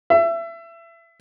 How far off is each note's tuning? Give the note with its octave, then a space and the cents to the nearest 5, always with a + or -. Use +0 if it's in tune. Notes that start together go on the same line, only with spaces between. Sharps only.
E5 +25